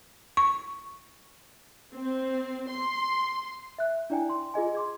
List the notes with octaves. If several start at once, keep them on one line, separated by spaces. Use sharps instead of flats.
C#6
C4
C6
E5 F#6
D4 E4 D5 G5 G#5
C6
F4 G#4 D#5 G#5
C6 D6 G#6